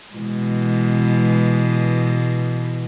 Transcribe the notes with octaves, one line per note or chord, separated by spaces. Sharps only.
B2 E3 G#3